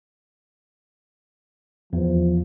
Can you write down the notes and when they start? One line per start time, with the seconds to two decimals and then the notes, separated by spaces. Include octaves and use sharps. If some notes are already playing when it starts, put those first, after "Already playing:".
1.93 E2 F3